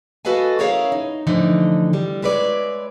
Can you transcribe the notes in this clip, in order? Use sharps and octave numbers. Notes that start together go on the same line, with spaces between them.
F#4 A4 B4 D#5 F5 G#5
C#4 E4 G#4 A#4 C#5 F5
D#4
A2 D3 E3 F3 D#4
D3 G3
G#3 E4 B4 C#5 D5